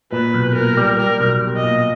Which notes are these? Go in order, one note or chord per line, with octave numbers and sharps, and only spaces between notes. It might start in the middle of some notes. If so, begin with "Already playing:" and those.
A#2 B4
B1
A#2 A#4
G3
G3 A#4
B1
B1
D#5
A#2